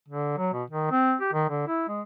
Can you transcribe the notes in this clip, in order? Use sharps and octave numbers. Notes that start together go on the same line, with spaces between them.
D3
F#3
B2
D#3
C4
G4
D#3
D3
E4
G#3